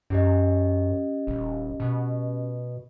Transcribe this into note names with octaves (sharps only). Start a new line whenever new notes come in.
F#2 C#4 G4 D#5
D#1
B2